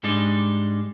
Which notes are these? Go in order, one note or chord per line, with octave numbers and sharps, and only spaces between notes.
G#2 G3 G#3 D4 D#4